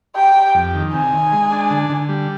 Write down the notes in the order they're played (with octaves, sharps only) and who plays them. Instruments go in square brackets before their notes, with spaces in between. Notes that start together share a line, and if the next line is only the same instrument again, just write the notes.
[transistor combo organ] G4 [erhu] G5
[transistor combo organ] G4
F2
D#3
[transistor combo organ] C3 [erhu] G#5
[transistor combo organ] D#3
G#3
D4
D3
D3
G3